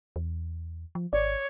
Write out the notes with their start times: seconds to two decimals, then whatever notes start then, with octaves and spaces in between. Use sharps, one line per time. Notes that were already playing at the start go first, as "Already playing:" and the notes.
0.16 E2
0.95 F3
1.13 G#1 C#5 D5